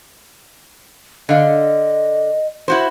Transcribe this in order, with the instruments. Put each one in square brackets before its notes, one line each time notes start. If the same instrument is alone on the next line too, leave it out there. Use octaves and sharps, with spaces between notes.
[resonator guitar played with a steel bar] D3 F5 [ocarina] D#5
[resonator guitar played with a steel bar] E4 F#4 C5